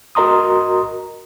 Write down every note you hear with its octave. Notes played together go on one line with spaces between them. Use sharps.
F#4 A#4 D#5 A#5 C6 D#6